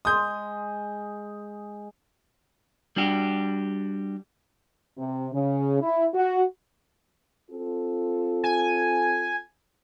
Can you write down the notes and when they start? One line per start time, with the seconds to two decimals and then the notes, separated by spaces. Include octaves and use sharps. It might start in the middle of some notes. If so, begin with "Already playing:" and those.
0.05 G#3 D#6 G6
2.96 G3 D4 F#4 G4
4.97 C3
5.33 C#3
5.80 E4
6.14 F#4
7.51 C4 F4 A4
8.44 G#5